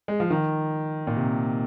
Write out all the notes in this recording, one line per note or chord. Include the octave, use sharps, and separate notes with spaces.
G#3
F3
D#3
A#2
C3